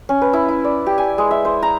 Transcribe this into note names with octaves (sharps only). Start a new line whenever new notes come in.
C#4
B4
E4
E4
D5
G4
G#5
G#3
E5
C5
A#5